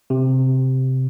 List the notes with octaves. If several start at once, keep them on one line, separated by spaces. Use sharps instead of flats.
C3